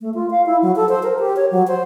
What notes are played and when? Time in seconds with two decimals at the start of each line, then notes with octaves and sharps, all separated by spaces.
0.01 A3
0.14 F4
0.31 F5
0.46 E4
0.62 F#3
0.76 A4
0.89 C5
1.03 A#4
1.19 G4
1.36 C#5
1.51 F#3
1.68 C5